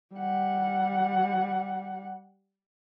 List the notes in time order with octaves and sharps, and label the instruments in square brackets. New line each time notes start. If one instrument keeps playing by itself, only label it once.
[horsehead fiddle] G3 F#5